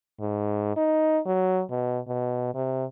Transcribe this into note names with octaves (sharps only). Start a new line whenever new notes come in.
G#2
D#4
F#3
B2
B2
C3